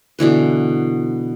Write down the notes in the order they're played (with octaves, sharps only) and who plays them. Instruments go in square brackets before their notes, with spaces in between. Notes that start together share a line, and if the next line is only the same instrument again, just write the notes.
[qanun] B2 D3 E3 B4